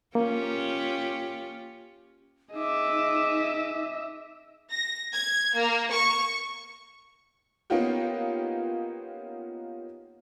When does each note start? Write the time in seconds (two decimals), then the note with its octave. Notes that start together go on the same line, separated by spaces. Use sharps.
0.15 A#3 C#4 F4 G4
2.54 D#4 G#4 D#5 E5 D6
4.71 A#6
5.13 G#6
5.58 A#3
5.92 C#6
7.70 A#3 B3 C#4 D#4 F4 G4